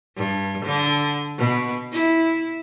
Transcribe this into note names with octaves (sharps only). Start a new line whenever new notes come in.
G2
D3
B2
E4